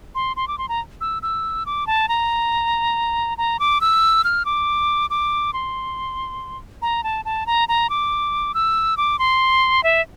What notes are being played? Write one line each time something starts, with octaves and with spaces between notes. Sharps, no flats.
C6
C6
D6
C6
A#5
E6
E6
D6
A5
A#5
A#5
D6
E6
F6
D6
D6
C6
A#5
A5
A5
A#5
A#5
D6
E6
D6
C6
E5